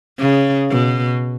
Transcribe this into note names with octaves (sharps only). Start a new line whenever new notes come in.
C#3
B2